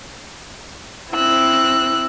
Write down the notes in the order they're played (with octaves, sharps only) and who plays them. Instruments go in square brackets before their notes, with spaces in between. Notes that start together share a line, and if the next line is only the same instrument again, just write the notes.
[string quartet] C4 E4 E6 F#6